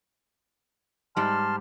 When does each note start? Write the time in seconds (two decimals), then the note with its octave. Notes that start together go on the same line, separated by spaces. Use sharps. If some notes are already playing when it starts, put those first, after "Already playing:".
1.17 G#2 G3 A5 C6 F6